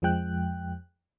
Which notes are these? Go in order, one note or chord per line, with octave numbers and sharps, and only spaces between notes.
F2 F3 G#3 G5 F#6